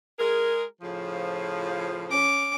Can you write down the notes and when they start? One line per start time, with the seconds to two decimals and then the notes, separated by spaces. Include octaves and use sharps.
0.19 G#3 G#4 A#4
0.82 A2 C#3 F3
2.10 C#4 D6